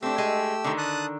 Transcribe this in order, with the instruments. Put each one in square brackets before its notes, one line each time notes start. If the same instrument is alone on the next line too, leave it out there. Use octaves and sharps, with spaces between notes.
[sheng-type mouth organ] A3 G4 E6 [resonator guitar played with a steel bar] C4 D4
[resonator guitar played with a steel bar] G#3 G#5
D3 D#3
[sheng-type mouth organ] A5 D#6 F#6